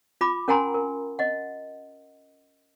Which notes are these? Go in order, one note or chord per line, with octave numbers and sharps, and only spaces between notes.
F4 B5 D6
C#4 A#4 F#5 G#5 A#5 C6
A#4
D#5 F#5